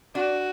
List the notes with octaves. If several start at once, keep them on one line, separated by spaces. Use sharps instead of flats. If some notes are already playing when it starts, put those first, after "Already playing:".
D4 F#4